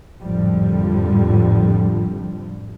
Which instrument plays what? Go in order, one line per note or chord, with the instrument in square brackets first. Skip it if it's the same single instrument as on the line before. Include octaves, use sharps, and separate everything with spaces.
[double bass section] G#1 F2 A2 D3 F3 G3